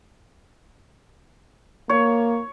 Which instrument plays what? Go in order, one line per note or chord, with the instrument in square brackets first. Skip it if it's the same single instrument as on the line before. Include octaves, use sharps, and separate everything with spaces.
[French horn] A#3 [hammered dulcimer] C#5